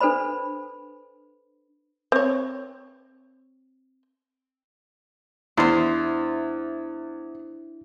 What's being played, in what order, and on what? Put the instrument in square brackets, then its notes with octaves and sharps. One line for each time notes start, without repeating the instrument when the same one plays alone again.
[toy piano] D4 A4 B4 C5 B5
[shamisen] C4 C#5
[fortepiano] E2 [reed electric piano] D4 E4 E5 [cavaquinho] C5 C6